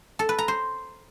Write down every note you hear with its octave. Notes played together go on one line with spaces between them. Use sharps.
A4
B4
A#5
C5